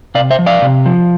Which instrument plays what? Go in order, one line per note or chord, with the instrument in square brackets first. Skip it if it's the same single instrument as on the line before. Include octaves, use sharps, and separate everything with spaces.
[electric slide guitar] C3 D5 F5
C5 E5
F3
D5 F5
C3
F3